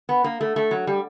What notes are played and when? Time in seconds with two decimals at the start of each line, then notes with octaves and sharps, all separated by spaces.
0.09 B3
0.24 A#3
0.41 A3
0.56 A3
0.71 F#3
0.87 G3